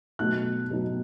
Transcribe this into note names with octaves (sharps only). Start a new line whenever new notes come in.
B2 F#3 A3 D#4 F#6
B2 F#3 A3 D#4